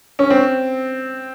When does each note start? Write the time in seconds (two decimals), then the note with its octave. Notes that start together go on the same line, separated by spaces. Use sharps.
0.19 C#4
0.30 C4